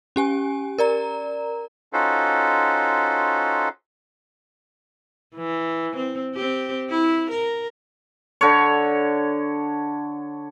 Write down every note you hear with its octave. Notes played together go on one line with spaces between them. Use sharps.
C#4 G4 G#5
A#4 D5 A#5
C#4 D#4 F4 F#4 A4 C5
E3
C4
C4 G4
E4
A#4
D3 C#5